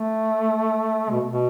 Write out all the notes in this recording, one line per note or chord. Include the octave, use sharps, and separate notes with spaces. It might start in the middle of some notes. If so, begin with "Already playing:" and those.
Already playing: A3
B2
B2